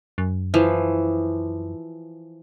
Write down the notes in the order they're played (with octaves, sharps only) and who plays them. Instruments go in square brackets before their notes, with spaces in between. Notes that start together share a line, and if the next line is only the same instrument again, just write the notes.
[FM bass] F#2
[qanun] E3 F3